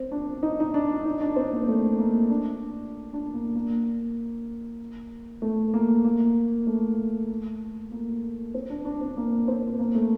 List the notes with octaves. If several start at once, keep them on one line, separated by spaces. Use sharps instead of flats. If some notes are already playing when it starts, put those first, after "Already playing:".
Already playing: C4
D4
D#4
D#4
D4
D#4
D4
C4
A#3
A3
A#3
D4
D4
A#3
A#3
A3
A#3
A#3
A3
A#3
C4
D4
D4
C4
A#3
C4
A#3
A3